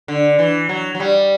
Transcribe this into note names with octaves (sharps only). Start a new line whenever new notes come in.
D3
E3
F#3
F#3
G3